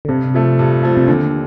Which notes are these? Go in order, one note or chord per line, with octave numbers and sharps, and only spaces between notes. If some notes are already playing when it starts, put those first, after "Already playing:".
D3
G2 C3
F3 A3
G2
F3 A3
C3
D#2 D3